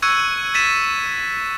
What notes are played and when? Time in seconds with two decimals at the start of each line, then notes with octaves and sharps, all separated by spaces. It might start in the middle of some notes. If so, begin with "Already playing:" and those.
0.02 C#6 E6 F#6 G#6 C#7 D#7
0.54 G#6 A6 B6 D#7 E7